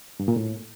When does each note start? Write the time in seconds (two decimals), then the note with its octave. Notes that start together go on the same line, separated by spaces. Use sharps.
0.20 G2
0.28 A#2
0.36 A2